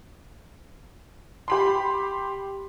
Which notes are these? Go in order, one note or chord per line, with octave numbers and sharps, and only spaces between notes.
G4 B5 C6